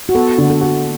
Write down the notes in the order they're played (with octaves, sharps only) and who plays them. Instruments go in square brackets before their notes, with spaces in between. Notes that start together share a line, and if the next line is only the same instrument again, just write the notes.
[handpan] F#4
[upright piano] B3 [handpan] A4
[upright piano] D3
[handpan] A4
[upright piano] F#4